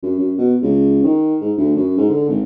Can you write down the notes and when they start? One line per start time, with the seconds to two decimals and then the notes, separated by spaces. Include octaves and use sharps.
0.02 F#2
0.19 F#2
0.38 B2
0.62 C#2
1.03 D#3
1.41 G#2
1.57 D2
1.76 F#2
1.97 G#2
2.09 D3
2.28 G#1